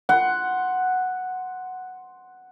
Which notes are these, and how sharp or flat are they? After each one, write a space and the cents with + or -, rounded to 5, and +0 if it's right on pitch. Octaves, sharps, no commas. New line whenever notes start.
F#5 +0 C6 +0